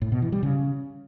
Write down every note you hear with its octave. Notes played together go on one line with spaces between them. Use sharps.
A2
B2
E3
G3
C#3